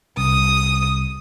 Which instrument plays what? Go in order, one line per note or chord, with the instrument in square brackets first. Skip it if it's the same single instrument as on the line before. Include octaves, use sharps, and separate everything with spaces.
[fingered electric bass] C2 [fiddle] D#6